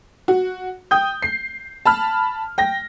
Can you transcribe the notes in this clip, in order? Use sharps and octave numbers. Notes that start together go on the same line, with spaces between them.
F#4
G5 D#6 G6
C7
A5 B5 F6
G5 A#6